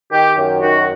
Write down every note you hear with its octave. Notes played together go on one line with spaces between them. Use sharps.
D#3 G4
F#2
D#3 F#4